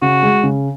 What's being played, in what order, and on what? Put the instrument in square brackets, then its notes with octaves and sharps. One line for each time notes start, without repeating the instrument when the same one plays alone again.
[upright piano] C#3 [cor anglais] F#4
[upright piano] G#3
C#3